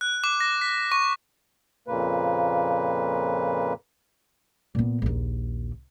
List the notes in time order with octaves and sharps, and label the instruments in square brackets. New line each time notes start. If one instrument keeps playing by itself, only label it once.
[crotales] F#6
D6
A#6
B6
C#6
[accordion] F2 A#2 C#3 A#3 B4
[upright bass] A#2 B3
A#1 D#2